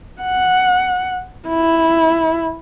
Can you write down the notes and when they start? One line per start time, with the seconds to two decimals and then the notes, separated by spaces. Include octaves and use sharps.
0.22 F#5
1.48 E4